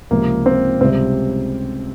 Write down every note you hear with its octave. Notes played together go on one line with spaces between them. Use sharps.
C#2 C3 F3 A#3
C4
C#2 C3 G3 C4